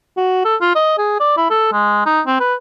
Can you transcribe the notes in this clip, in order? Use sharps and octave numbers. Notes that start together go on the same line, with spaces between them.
F#4
A4
F4
D#5
G#4
D5
E4
A4
G#3
D#4
C4
B4